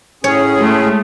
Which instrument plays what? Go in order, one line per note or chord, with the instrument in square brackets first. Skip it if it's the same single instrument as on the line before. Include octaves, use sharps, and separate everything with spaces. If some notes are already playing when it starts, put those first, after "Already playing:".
[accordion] A2 C#4 G#4 [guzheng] C#5
[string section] G#3 A3